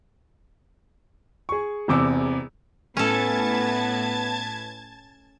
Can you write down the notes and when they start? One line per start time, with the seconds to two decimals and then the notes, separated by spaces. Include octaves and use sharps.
1.49 G#4 C#6
1.88 E1 E2 C3 D6 E6
2.97 A2 B3 C#4 A4 B4 A5 G#6 A6